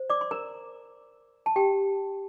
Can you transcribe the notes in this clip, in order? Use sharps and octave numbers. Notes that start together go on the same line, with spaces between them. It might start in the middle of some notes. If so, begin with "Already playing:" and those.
Already playing: C5
D5 D6
C6
A#4 A#5
A5
G4 G5